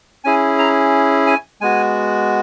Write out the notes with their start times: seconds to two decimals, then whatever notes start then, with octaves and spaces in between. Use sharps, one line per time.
0.24 C#4 E4 G#4 G#5
0.59 A#5
1.27 G#5
1.61 G#3 B3 F#4 G#5